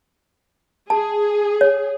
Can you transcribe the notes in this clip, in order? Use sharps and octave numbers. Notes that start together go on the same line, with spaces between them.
G#4 A5
C#5